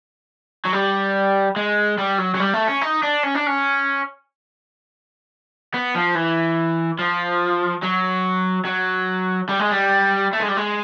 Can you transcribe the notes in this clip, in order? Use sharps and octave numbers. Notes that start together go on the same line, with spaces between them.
F#3
G3
G#3
G3
F#3
F#3
G3
A3
C#4
D#4
D4
C#4
D4
C#4
B3
F3
E3
F3
F#3
F#3
G3
G#3
G3
A3
G#3
G3
G#3